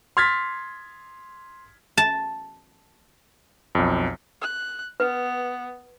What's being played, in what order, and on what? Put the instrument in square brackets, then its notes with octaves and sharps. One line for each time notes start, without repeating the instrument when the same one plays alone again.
[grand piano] C6 F6 G#6 A6 B6
[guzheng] A5
[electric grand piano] B1 F2
[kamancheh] F#6
[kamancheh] B3 [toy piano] B4